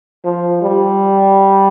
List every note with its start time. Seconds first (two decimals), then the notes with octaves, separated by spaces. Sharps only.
0.25 F3
0.62 G3